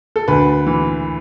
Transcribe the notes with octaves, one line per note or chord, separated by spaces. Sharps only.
A4
D2 B4
E3